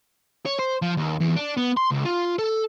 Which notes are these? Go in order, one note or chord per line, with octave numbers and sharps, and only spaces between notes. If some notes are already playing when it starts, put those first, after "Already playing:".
C#5
C5
F3
D#2
E2
D4
B3
C6
C#2
F4
A4